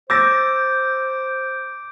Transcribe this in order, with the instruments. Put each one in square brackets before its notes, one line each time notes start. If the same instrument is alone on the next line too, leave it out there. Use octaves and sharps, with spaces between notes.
[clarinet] C5 [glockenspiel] D6 [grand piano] E6 A6 A#6 [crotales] G6 D7